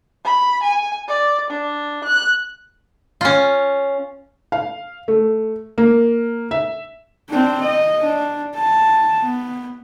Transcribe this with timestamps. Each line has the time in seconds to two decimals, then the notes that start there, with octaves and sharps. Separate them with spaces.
0.25 B5
0.63 G#5
1.08 D5
1.50 D4
2.04 F#6
3.21 C#4 F4
4.52 F5
5.08 A3
5.78 A#3
6.51 E5
7.29 C4 D4
7.61 D#5
8.02 D4
8.56 A5
9.20 B3